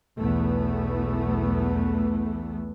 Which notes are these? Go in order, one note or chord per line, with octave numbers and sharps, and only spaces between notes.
B1 E2 E3 A3 B3